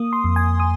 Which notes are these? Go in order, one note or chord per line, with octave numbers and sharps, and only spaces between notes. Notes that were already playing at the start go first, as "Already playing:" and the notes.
Already playing: A#3 D#6
C6
F2
G#5
D#6